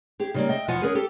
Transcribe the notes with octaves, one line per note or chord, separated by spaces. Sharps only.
G4 G#4
C#3 G3 A#3
D#5 E5 G5
E2 B2 F3 F4 F#5 G#5
C#4 G#4 A#4 B4
G4 A4